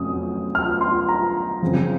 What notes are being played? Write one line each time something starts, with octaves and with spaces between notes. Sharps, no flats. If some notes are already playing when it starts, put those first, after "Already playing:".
Already playing: F2 C3 F#3 A3 C#4 D#6
F6
C6
A#5
F#2 C#3 F3 C4